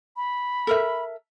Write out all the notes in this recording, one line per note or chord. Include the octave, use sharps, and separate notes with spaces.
B5
A4 A#4 E5